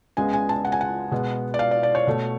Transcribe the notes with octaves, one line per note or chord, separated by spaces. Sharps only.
C#2 C#3 G#3 B3 G#5
G#5
A5
F#5
G#5
F#5
B2 G#3 B3
D5
F5
D5
D5
C#5
B2 A3